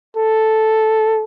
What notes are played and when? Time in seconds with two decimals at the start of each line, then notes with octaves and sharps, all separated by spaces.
0.17 A4